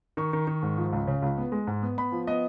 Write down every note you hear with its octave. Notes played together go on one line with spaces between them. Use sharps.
D#3 C#6
D#3
D#3
G#2
F3
C#2
C#3
C#2
B3
G#3
G#2
B3
B3 B5
F3
B3 D#5